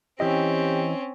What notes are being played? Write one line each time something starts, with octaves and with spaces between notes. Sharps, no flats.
E3 C4 C#4 E4 G4 D#5